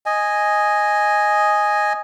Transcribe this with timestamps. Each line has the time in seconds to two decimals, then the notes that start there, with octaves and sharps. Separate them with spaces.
0.06 D#5 G#5